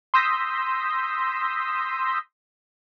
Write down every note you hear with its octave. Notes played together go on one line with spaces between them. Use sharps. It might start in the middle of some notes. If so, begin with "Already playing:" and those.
C6 D#6 E6 G6 A#6 B6